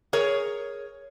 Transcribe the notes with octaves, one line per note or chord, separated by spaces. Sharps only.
G#4 A#4 C#5